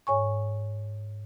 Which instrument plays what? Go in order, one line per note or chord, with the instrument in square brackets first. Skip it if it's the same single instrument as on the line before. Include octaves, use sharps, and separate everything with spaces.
[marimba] G#2 C#5 G#5 C#6